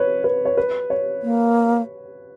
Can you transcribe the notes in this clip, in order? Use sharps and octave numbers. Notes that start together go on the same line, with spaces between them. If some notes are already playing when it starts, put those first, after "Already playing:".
Already playing: B4 C#5
B4
C#5
B4
C#5
A#3